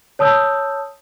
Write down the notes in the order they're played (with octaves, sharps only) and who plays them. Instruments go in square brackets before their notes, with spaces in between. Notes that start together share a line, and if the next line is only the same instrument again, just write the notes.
[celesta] C#5 A5 D#6 E6 G6